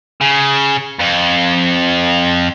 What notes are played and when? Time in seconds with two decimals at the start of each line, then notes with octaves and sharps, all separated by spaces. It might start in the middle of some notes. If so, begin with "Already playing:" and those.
0.21 C#3
0.99 F2